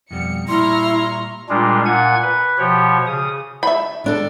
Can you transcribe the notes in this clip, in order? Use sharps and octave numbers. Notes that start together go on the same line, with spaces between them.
F2 B2 G3 C#7
A#2 G3 E4 A#5 C6 C#6 F6
A#2 G3 G#3 D4 F4
A#2 F#5 G#5 G#6
B4
B2 F3 G4 C#5
C#3 D#6
E5 B5
D#3 D4 A4